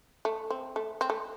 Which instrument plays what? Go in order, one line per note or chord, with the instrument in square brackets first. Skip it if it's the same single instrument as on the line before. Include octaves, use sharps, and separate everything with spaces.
[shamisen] A3
C4
A3
C4
A3